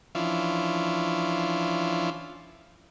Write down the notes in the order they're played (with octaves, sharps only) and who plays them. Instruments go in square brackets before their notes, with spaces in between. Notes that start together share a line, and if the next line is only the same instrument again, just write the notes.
[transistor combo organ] E3 F3 C#4 D4 E4 F4